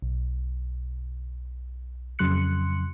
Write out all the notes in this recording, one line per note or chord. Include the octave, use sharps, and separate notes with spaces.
B1
F2 C#3 F#3 C6 F#6 C#7